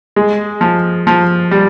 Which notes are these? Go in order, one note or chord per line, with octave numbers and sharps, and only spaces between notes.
G#3
F3
F3
G3